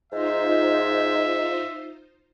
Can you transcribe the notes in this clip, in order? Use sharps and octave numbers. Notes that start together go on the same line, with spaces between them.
G#2 D#4 F4 C5 D#5 E5